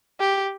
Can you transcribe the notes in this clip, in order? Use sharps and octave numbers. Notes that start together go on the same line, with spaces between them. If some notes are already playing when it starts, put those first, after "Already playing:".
G4